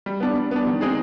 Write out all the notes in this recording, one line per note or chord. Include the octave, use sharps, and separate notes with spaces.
G3
B3 D4
G3
B3 D4
D#3
G#3 C4 D#4 G#4